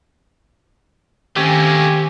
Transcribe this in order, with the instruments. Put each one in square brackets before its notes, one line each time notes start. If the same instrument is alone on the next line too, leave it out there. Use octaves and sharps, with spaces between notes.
[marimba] D#3 C#4 [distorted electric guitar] A3 A#3 [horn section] C4 G4 G#5